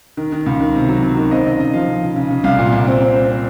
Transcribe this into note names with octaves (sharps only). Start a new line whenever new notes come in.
D#3
D#3
C#2
D#3
C3
F#3
F#3
D#3
C4 D#5
C#3 D#5
C#3 D#5
F3 F5
F3
C#3
C#3
C#3
C2 F5
A#2
C2
C4
C4
C4
C4